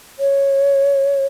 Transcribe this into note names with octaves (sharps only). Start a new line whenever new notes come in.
C#5